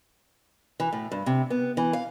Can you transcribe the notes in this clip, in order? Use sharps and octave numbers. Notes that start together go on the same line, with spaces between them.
E3
A2
G2
C3
B3
E3
F5